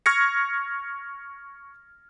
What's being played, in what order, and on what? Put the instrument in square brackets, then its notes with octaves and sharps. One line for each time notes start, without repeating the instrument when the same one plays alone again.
[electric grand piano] C#6 F6 G#6 A#6 C#7